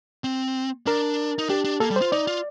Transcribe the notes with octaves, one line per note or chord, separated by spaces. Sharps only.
C4
D4 A#4
D#4
D4 G4
D4
A#3 A4
G3
C5
F4
D#4 D5
F4